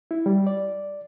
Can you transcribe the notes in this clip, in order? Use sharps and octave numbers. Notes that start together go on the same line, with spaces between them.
E4
G3
D5